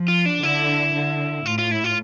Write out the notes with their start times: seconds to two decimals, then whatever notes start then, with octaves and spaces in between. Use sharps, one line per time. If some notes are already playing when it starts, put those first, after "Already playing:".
Already playing: F3
0.08 F4
0.26 D4
0.43 D3 E4
0.94 D3
1.46 A2 F4
1.58 F4
1.71 E4
1.84 F4